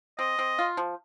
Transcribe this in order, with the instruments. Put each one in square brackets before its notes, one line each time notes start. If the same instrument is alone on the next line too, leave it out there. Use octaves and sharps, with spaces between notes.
[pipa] C4 [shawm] D#5
[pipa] C4
F4
F3